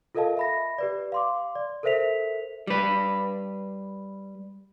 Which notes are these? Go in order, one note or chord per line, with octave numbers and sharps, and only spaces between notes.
F4 A4 A#4 D#5 F5 A5
E5 B5 A#6
G4 B4 D5
F5 C6 D6
D5
A4 A#4 C5 E5 B6 F7
G3 B4